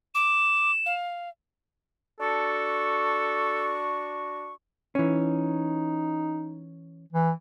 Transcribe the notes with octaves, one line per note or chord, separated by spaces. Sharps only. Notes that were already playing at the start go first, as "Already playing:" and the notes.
D6 E7
F5
D4 F#4 A4 C#6
E3 C#4 D#4
E3